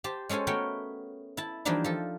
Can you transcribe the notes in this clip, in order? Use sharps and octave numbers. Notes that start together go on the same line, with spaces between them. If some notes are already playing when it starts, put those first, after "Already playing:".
G4 C5 A5
G#3 C#4 A4 C5 G#5
A3 B3 F#4 A#4 C#5 G5
E4 A5
E3 F3 G3 A#3 D4 D#4
F3 A4